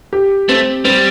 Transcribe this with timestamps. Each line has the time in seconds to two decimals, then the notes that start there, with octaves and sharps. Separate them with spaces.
0.13 G4
0.49 A3 C4
0.85 G3 C4